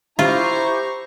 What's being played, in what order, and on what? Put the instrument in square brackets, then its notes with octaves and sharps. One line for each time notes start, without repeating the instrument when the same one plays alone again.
[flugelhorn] E4 [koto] F4 [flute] G4 [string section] C5 A#5 C#6